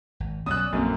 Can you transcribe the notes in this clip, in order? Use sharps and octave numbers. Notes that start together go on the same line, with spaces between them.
G#1
B1 B3 C#4 D5 D#6 E6 F#6
A#1 F#2 A3 A#3 C4